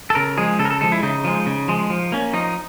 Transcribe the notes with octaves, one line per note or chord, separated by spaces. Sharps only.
A4
C#3 A#4
F3 G#3 G#4
C#3 A4
A#4
A4
F3 G#3 A4
E4
C#3 D#4
F3 G#3
C#3
F3 G#3
F3
A#3 C#4
F3 D#4